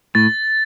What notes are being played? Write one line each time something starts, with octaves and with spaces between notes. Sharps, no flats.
A2 A6